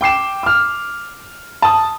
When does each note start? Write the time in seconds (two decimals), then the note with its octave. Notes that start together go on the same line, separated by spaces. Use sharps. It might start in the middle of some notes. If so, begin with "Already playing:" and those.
0.01 G5 D6 C7 E7
0.43 D6 F6
1.62 A5 D#6